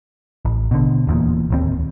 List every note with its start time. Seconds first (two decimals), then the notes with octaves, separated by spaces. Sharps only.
0.45 A1
0.71 B2 D3
1.07 D#1 E2 A#2
1.50 D1 D#2 C4